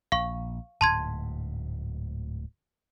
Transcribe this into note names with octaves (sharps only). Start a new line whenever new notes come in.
A#1 F5 C#6
D1 D2 G#2 A5 C6 G#6